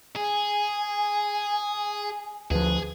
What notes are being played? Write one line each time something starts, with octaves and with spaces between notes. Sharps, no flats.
G#4 G#5
D2 F3 G#4 B4